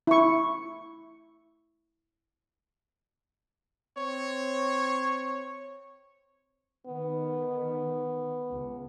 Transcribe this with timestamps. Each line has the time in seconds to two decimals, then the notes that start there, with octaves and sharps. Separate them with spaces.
0.07 E4 C#6
3.98 C4 C#5
6.87 D#3 B3
8.51 C#2